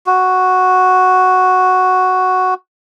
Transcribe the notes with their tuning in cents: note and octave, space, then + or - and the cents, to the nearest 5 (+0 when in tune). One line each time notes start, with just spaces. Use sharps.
F#4 +0